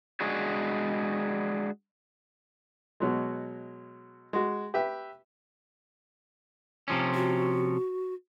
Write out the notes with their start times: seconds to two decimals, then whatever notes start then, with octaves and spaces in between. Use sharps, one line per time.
0.21 G#3 D4 F#4 G#4 C#5
3.00 B2 F#3 G#3
4.33 G#3 F#4
4.74 G4 B4 E5
6.88 C3 F3 C#4
7.15 F#4